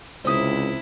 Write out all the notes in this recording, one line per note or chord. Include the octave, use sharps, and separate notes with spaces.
C#2 C3 C4 E4 D#6